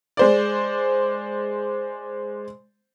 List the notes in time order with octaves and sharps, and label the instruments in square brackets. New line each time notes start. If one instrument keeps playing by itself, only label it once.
[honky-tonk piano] G#3 C5 D5